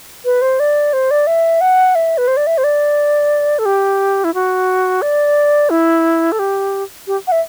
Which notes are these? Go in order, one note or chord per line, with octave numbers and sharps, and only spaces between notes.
B4
C5
D5
C5
D5
E5
F#5
E5
B4
C5
D5
E5
C5
D5
A4
G4
E4
F#4
D5
E4
A4
G4
G4
F#5
E5